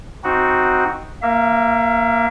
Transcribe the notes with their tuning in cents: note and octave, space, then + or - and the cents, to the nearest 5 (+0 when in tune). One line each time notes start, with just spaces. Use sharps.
C4 +0 D#4 +0 F#4 -5
A#3 +0 E5 +35